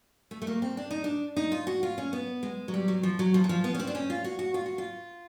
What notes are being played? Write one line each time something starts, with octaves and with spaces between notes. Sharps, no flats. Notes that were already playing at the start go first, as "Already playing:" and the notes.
A3
A3
A#3
C4
D4
D#4
D4
D#4
F4
F#4
F4
C#4
B3
G#3
F#3
G3
F#3
F3
F#3
F3
F#3
F3
B3
C#4
C4
D4
C#4
F4
F#4
F#4
F4
F#4
F4